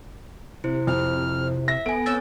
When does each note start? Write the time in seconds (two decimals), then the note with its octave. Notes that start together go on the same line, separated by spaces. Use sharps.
0.64 C3 E4 C5
0.87 F2 F6
1.68 E5 A#6
1.86 B3 A4 G#5 D7
2.06 C4 C#5 E6 A6